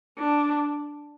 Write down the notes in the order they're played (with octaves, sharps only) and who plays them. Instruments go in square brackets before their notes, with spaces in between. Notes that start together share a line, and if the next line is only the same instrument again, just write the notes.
[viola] D4